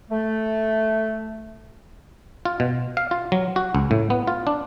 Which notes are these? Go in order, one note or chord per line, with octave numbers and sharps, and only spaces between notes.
A3
F4
B2
F5
F4
F#3
F#4
C#2
A2
B3
F4
D4